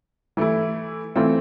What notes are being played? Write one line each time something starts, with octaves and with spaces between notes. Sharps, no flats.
E3 A3 E4
E3 A3 C4 F4